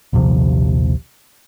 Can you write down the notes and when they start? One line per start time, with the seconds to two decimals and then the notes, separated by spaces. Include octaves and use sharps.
0.13 A#1 D#2 C3 F3